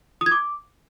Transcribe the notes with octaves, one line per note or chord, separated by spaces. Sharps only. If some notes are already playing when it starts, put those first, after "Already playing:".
D#6
G#6
D6